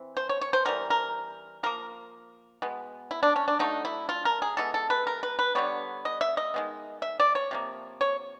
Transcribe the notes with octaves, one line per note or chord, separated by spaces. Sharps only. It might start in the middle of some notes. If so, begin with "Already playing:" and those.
Already playing: E3 C4
C5
C#5
C#5
C5
E3 G3 B3 A#4
A#4
F3 A#3 A#4
B2 G#3 B3
E4
D4
C#4
D4
D3 F#3 A3 D#4
E4
F4
A#4
G#4
E3 G#3 B3 A4
A4
B4
A#4
B4
B4
D3 G3 B3 C#5
D#5
E5
D#5
D#3 G#3 B3
E5
D5
C#5
C3 F3 A#3
C#5